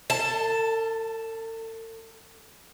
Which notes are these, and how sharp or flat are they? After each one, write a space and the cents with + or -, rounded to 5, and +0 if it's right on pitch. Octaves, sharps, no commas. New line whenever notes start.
A4 +40 A5 +0